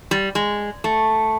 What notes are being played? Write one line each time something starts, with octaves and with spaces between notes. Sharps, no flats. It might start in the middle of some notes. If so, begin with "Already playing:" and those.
G3
G#3
A3